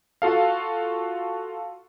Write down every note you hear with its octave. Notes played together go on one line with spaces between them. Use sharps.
F4 F#4 A4 F5